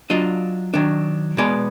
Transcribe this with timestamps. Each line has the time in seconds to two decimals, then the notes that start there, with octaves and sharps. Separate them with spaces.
0.10 F#3 D4 F4 D#5
0.74 D#3 F#3 D4
1.37 B2 G#3 B3 D5